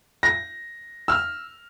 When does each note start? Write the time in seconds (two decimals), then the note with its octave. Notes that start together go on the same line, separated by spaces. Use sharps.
0.23 A#6
1.08 E6 F6